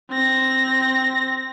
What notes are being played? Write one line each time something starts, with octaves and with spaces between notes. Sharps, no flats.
C4 A#6